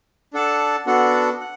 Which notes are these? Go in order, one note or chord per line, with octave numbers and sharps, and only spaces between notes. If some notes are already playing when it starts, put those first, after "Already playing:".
D4 A4 F#5 A5
B3 D4 F#4 A4 F#5
F#5